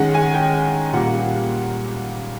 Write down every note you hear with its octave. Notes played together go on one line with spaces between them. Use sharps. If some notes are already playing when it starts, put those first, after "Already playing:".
Already playing: D#3 G#3 C#4 F#5
G#5
G5
A#2 G3 A#3 F#5